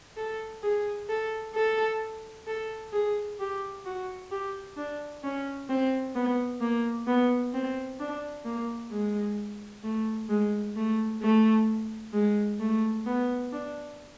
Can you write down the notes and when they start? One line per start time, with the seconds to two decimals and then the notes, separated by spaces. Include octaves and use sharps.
0.17 A4
0.63 G#4
1.09 A4
1.54 A4
2.47 A4
2.93 G#4
3.39 G4
3.85 F#4
4.31 G4
4.77 D4
5.23 C#4
5.69 C4
6.15 B3
6.61 A#3
7.07 B3
7.54 C4
7.99 D4
8.45 A#3
8.91 G#3
9.84 A3
10.29 G#3
10.76 A3
11.22 A3
12.13 G#3
12.60 A3
13.06 B3
13.52 D4